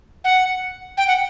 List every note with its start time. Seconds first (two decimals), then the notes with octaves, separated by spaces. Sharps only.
0.24 F#5
0.97 G5
1.08 F#5